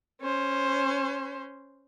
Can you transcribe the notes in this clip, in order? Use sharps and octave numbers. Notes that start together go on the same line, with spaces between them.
C#4 C5